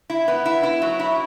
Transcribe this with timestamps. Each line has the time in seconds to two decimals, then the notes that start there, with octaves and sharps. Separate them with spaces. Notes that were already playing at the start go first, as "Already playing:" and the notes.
0.10 E4
0.28 B3
0.45 E4
0.63 E4
0.82 F#3
1.00 E4